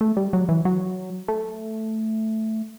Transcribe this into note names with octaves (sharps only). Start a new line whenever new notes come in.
A3
G3
F#3
E3
F#3
A3